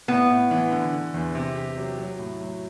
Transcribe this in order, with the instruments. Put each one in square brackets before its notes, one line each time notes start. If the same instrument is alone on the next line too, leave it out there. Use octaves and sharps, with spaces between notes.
[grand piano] A2 [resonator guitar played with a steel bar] B3
[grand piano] A2
E3
D3
D3
E2
C3
G4
F#3
F#3
A2
F#3